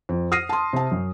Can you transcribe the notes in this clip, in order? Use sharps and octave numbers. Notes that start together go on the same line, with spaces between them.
F2
D#6 F6 A#6 C7 D#7
A5 C6
C3 A5
F#2